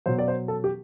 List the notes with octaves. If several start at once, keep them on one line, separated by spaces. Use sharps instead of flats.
B2 F#3 C5
D5
C5
A4
G4